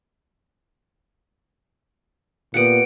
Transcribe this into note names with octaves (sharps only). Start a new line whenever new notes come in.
A#2 B3 G4 F#5 C#7 D7